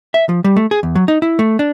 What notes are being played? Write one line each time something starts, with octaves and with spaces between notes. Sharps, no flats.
E5
F3
G3
A3
G#4
E2
F#3
D#4
E4
A3
D4